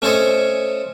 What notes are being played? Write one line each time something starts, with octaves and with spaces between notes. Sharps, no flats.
A3 C#4 A4 C5 C#5 D#5